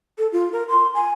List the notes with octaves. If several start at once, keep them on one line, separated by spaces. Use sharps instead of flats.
A4
F4
A#4
C6
G#5